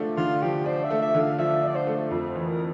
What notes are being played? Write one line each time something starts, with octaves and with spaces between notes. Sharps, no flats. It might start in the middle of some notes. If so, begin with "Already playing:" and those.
Already playing: D3 F3 A3 D4
D3 F4
F3 G4
D4 C5
E5
A3
E5
D3
F5
F3 E5
D4 D5
C5
A3
F2
C5
E3
A#4